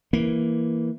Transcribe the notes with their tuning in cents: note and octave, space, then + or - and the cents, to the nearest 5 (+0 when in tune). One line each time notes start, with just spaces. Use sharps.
E3 +0 A#3 +0